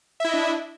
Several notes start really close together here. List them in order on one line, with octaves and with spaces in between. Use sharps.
E5 E4 D#5 D4